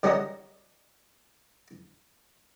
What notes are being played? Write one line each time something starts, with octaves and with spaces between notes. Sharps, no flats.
D#3 G3 C#4 F#4 A#4 D#5